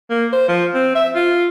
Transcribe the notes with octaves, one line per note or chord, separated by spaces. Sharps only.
A#3
C5
F3
C4
E5
F4